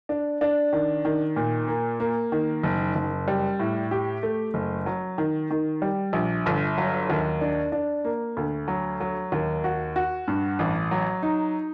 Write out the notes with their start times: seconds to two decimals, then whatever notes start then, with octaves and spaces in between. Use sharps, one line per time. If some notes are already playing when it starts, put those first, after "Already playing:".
0.09 D4
0.41 D4
0.73 D#3
1.05 D#3
1.36 A#2
1.68 A#3
2.00 A#3
2.32 D#3
2.64 F#1
2.95 F#1
3.28 G3
3.60 A2
3.91 G4
4.23 A3
4.54 F#1
4.86 F#3
5.18 D#3
5.51 D#3
5.82 G3
6.13 A#1
6.46 G1
6.78 F#3
7.10 D#2
7.41 D4
7.72 D4
8.05 A#3
8.37 D2
8.68 F#3
9.00 F#3
9.32 D#2
9.64 F#4
9.96 F#4
10.28 G2
10.59 A1
10.91 F#3
11.23 D#4